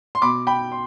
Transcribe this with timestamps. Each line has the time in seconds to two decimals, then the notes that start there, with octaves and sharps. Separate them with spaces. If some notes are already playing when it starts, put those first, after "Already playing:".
0.15 C6
0.22 B2 B5 D6
0.47 G5 B5
0.72 C6